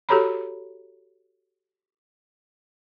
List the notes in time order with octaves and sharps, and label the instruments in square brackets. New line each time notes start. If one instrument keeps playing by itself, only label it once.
[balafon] F#4 G4 A4 C#5 A#5 B5